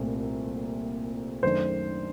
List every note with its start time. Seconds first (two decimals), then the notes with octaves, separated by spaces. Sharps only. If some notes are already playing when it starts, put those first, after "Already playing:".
Already playing: C2 A#2 A3 C4
1.43 F#2 D#3 A3 D4 C5